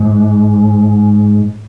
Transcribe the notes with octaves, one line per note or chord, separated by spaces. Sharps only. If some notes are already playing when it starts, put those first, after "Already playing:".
Already playing: G#2